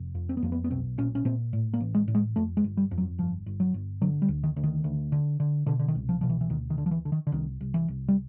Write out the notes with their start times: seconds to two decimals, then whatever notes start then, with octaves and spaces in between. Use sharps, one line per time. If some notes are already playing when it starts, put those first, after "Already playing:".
Already playing: F1
0.15 F2
0.29 C4
0.37 B3
0.42 F2 A#3
0.52 B3
0.64 B3
0.70 B1 C4
0.98 A#2 C#4
1.15 C#4
1.25 A#2 C4
1.53 A2
1.74 A#3
1.80 A1
1.95 G#3
2.08 A2
2.15 G#3
2.36 F2 A3
2.57 G#3
2.64 G1
2.77 G3
2.91 F2
2.98 F#3
3.18 G1 F3
3.46 G1
3.60 F#3
3.74 G1
4.02 D3 F#3
4.22 G3
4.28 D2
4.43 D#3
4.56 D2
4.63 D#3
4.84 D2
5.12 D3
5.40 D3
5.66 B2 D3
5.79 D3
5.88 D#3
5.95 C2
6.09 F3
6.21 B2 F3
6.29 E3
6.41 E3
6.50 D2 D#3
6.70 D#3
6.78 D3
6.86 F3
6.91 E3
7.05 D3
7.12 D#3
7.27 D3
7.32 C2 D#3
7.61 C2
7.74 E3
7.88 C2
8.08 G3